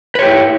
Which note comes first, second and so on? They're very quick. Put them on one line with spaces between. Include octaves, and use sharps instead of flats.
B4 C#5 G4 E4